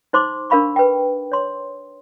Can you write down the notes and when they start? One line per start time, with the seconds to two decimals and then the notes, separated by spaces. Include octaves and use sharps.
0.13 D#4 C5 C6 D6
0.50 D4 A#4 F5 B5 C#6
0.76 B4 G5
1.32 C#5 C6